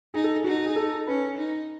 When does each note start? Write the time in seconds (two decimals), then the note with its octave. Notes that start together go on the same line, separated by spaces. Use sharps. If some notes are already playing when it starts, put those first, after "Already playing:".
0.14 D#4 G#4
0.24 A4
0.34 G#4
0.44 D#4 F#4
0.55 F#4
0.66 G#4
0.76 A4
1.07 C#4 B4
1.38 D#4